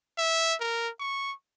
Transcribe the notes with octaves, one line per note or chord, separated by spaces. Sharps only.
E5
A#4
C#6